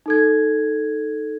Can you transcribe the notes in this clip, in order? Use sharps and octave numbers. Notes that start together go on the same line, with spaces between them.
D#4 A4 G#6